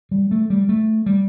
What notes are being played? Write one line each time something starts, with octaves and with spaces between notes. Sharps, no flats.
G3
A3
G3
A3
G3